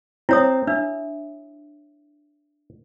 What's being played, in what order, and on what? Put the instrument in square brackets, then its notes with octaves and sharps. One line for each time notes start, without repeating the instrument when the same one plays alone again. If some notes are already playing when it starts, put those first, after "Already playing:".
[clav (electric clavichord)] C4 [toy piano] E4 C#5 D#6
[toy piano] D4 [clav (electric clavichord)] E5